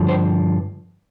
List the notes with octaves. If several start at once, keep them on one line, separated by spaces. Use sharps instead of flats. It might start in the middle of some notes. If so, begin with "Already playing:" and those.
Already playing: G2 D3 F3
C5